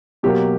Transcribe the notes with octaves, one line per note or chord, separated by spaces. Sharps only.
B2 F#3 A#3 G4